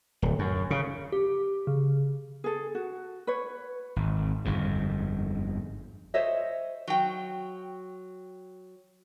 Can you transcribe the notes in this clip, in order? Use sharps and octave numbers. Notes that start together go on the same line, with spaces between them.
D1
F#2
C#3
G4
C#3
G#4 A4
F#4
B4 C#5
G#1
G1 F2 G#2
C5 C#5 D#5 E5
F#3 G5